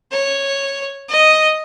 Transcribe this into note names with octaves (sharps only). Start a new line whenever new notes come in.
C#5
D#5